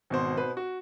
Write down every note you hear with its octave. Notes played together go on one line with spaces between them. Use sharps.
G#1 B2 C5
B2 B4 C5 C6
F#4